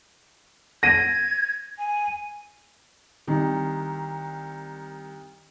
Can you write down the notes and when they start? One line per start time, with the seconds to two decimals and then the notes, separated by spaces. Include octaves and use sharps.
0.83 G#6 A#6 D#7
1.78 G#5
3.27 C2 D#3